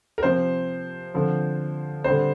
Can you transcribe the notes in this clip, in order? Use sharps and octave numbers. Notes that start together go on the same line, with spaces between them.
A#4
C3 F3 C4 C5
D3 F3 C4
D3 G3 C4 C5